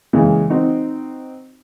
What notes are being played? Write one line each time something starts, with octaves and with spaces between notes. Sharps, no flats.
C#3 E3 G#3 A#3
C4 D#4 F#4